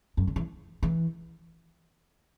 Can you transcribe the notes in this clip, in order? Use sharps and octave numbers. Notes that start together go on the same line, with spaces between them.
F#2
D3
E3
E3